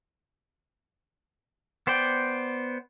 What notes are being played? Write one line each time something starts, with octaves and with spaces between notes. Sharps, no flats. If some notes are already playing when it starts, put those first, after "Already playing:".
B3 C5 D5 G5